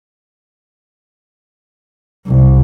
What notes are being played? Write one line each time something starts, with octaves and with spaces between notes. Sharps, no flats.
C2